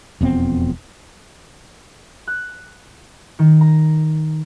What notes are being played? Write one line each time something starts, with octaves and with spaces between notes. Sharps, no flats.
E1 F2 B3 C4
F#6
D#3
A#5